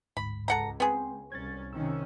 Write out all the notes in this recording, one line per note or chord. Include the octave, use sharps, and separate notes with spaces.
A1 D2 G#2 B5
C#2 A4 F#5 A#5
B3 C4 G#4 G5 C6
C2 C#4 G#6 A6
C3 D#3 C#4 E6